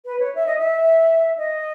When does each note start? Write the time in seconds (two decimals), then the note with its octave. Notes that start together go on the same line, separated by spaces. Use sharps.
0.05 B4
0.20 C#5
0.35 E5
0.46 D#5
0.59 E5
1.38 D#5